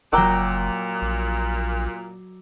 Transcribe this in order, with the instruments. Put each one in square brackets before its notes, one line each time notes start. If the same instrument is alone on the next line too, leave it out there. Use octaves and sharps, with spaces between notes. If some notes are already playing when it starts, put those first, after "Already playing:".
[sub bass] F#1 [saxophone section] A#2 [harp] F#3 G5 F#6 [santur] A#5 D6 E6
[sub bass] A#1